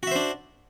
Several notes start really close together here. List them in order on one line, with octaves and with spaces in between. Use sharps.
F#4 E5 C5 D4